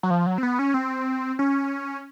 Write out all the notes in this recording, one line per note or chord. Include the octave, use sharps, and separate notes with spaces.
F#3
F3
F#3
C4
B3
C#4
C4
C#4